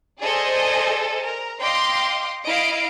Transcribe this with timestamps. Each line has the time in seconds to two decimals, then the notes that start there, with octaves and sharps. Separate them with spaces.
0.23 G#4 A4 C5 D5 D#5 G#5
1.23 A#4
1.60 D#5 F5 G5 C6 D6
2.45 E4 D#5 F5 C7 D7